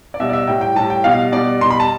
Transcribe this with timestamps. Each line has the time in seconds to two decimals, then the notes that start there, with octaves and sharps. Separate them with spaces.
0.14 D5
0.20 B2 G3 E5
0.29 D5
0.33 E5
0.47 A2 G3 G5
0.61 G5
0.75 A2 G3 A5
0.90 G5
1.04 B2 G3 F5
1.32 B2 G3 D5
1.61 B2 G3 C6
1.70 B5
1.80 A5